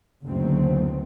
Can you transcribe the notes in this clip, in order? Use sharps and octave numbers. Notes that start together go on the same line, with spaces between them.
F#1 D2 F#3 A3 B3 C4